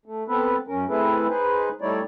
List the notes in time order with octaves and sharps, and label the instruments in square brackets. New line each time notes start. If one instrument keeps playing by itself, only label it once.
[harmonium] A3
B3 C4 A4 B4
F#2 C#4 A#4
A3 C4 E4 G#4 A4 B4
D#4 G#4 B4 C5
G3 A3 D#4 E4 C#5 D5